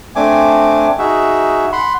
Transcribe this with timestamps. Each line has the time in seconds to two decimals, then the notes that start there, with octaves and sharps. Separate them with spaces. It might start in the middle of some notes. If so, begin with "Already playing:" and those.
0.16 A3 C4 D4 G#5 D6
0.99 D#4 F#4 G#4 E5
1.72 F#5 B5 C6